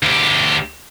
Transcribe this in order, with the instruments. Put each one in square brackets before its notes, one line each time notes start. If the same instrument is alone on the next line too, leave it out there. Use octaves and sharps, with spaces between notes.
[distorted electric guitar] D2 G4